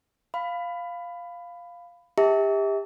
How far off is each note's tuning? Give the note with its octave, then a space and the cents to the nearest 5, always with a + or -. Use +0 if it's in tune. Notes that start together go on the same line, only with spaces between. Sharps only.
F5 +0 B5 +15
G4 +30 E5 -35 A5 +20